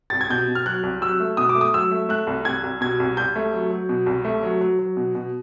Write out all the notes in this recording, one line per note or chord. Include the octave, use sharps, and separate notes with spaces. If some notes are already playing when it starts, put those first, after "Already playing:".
C2 A6
G#6
B2 G6
B2
F6
F#3 F#6
C2
F#3 E6
A3
B2 D#6
D6
A3
D#6
F#3 E6
A3
A3 F#6
C2
C2 G#6
C2
B2 G#6
C2
C2 G6
A3
F#3
F#3
B2
C2
A3
F#3
F#3
F#3
B2
B2